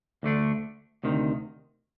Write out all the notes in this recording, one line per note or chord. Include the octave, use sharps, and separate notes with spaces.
D2 D3 A3 D4
D2 C3 D#3